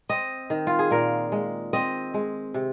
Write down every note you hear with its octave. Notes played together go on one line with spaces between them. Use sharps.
C4 D#5
D#3
F4
G#4
A#2 A#4
G#3
C4 D#5
G#3
C3